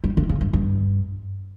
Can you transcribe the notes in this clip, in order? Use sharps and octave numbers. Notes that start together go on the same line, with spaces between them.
G3
D3
C#3
G2
G2